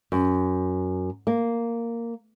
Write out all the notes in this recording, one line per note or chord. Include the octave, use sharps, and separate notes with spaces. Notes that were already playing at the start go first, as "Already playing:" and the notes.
F#2
A#3